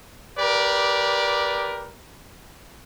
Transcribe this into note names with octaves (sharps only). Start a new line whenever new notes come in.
G4 A#4 B4 D5